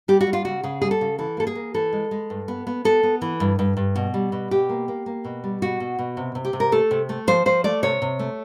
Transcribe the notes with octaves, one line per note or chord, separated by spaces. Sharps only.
G3 G4
F#4
G3
F4
C#3 F#4
C#3 G#4
G3 G#4
A4
C#3
E3 A4
A#3 A4
G#4
A#3
E3 A4
G#3
G#3
G2
B3
B3
B3 A4
B3
E3
G2
G2
G2
B2
G3
B2
B2 G4
A#3
A#3
A#3
B2
G3
B2 F#4
B2
B2
C3
C3
G4
C3
A#4
A3 A4
C3
A3
F3 C5
F3 C5
A3 D5
C3 C#5
C3
A3